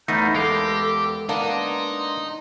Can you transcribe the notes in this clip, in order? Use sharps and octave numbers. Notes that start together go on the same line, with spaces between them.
E2 A3 B3 D#4 A#5 F6 G6
G#3 G4 A4 A#4 F5
A#3 B3 D4 D#4
C6